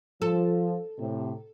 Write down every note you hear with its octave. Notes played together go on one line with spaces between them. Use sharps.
F3 A4
A2 C3